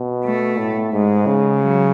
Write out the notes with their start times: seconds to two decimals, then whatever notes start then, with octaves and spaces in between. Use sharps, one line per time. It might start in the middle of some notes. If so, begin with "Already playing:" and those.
Already playing: B2
0.25 A3
0.59 A2
0.93 G#2 G#3
1.26 C#3
1.59 F#3